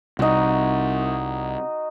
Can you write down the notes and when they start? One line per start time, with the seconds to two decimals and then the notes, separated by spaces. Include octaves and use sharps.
0.19 C2 D#4 F#4